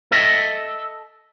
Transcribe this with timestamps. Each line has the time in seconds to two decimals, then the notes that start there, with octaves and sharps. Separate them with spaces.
0.12 A4 D#5 E5